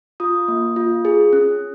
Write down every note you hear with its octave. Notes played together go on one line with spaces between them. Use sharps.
F4 D#6
A#3
F4
G#4
C#4